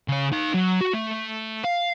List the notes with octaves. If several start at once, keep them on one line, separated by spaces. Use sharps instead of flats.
C#3 C#5
D#4 F5
F#3
F#4
A3
F5